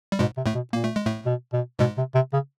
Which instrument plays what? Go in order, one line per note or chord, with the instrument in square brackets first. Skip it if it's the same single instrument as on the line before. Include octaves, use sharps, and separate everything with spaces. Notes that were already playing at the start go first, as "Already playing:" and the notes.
[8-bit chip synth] G3
[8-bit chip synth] G#2 G#3 [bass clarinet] B2
[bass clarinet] C3
[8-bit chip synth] A2 A3
[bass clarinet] B2
[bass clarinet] A#2 [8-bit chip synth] A#3
[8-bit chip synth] A3
G#3
A2 A3
[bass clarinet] B2
B2
[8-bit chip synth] G#2 G#3 [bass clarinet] B2
[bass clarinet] C3
C3
C#3